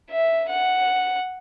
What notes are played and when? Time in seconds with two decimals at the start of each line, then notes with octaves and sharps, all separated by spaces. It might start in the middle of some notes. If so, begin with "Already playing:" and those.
0.11 E5
0.49 F#5